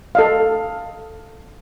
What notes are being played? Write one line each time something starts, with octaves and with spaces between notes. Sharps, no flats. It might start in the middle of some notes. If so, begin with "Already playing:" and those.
A4 D#5 F5